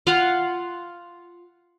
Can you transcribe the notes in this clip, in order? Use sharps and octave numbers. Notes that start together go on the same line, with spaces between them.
F4 F5 F#5